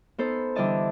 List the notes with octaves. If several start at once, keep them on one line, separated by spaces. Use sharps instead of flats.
B3 D#4 A4 C5
D3 E3 G3 D5 D#5 A5